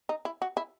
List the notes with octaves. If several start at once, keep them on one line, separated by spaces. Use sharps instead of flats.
D#4
E4
F#4
E4